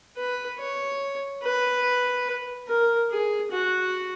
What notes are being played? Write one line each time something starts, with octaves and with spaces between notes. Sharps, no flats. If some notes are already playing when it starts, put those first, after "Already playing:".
B4
C#5
B4
A#4
G#4
F#4